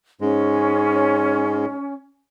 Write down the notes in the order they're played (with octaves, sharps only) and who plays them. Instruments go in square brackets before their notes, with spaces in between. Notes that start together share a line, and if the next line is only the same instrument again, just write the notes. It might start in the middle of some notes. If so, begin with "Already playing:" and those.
[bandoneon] G#2 G#3 [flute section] C#4